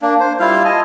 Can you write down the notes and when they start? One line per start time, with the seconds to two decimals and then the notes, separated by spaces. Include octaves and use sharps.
0.02 A#3 D4
0.20 C5
0.40 G3 E4 F4 F5
0.65 D#5 G#5 A5